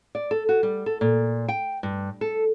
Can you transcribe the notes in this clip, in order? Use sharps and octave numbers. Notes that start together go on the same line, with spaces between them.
D5
A4
F#4
G3
A4
A#2
G5
G2
A4